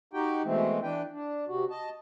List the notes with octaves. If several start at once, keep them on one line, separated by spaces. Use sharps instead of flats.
D#4 F#4 G4 G5
B2 E3 G#3 A3 C4
E3 D4 B4 G5
D4
C3 F#4
D#5 A5